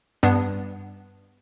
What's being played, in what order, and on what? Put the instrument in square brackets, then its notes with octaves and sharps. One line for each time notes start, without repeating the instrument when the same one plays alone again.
[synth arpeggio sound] G2 B3 D4